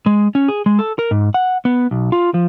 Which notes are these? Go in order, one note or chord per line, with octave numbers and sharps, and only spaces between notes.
G#3
C#4
G#4
G#3
A4
A#4
G#2
F#5
B3
B1
F4
F3